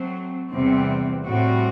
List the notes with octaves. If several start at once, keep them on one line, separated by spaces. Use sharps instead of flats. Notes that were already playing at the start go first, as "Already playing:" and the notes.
Already playing: F#3 A3 C4
E2 C3 E3 G3 C4
A2 G3 C4 F#4